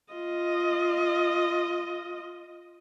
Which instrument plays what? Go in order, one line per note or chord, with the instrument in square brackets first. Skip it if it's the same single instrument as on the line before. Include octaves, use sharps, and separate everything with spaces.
[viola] F4 D#5